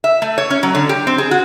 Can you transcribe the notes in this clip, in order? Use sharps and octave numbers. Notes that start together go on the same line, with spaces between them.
E5
A3
C#5
C#4
F#3
D3
G4
C4
G#4
F#4